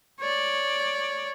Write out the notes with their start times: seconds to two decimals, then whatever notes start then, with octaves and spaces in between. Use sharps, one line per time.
0.21 C#5 D5